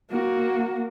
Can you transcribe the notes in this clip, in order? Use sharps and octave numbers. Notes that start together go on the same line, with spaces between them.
A#3 F#4